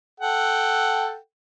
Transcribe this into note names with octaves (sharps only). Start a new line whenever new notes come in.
A4 F#5 G5